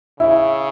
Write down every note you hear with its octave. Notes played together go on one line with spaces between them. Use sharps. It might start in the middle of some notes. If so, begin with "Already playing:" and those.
C#3 E4